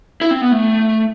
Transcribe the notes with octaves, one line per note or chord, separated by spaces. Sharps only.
E4
C4
B3
A3